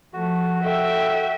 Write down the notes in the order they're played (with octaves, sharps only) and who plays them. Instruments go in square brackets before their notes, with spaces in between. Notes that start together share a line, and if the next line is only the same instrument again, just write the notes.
[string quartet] F3 A3 [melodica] F#4
[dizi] A4 [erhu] E5 [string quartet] G5